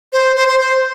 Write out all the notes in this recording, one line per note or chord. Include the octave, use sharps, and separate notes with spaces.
C5
C5
C5
C5